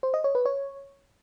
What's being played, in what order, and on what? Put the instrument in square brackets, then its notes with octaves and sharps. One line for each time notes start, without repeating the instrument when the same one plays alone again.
[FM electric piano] C5
D#5
C#5
B4
C#5